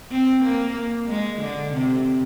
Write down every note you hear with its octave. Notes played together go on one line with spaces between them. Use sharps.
C4
A#3
G#3
D3
C3